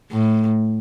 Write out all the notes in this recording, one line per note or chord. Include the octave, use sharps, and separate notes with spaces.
A2